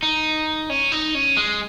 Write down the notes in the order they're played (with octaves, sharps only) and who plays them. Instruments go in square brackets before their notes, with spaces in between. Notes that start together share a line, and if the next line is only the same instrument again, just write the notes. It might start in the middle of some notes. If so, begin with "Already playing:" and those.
[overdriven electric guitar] D#4
C#4
D#4
C#4
G#3